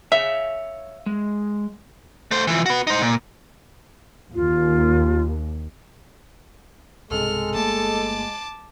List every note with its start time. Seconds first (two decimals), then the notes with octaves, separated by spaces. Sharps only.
0.12 C#5 E5 F5
1.06 G#3
2.31 A3 C5
2.47 E3 F3
2.66 F#4 B4
2.87 D#4 C5
3.02 A#2
4.34 D#2 F4
7.11 B1 G2 C3 G#3 A4 F6
7.54 G1 A3 A#3 A5 D6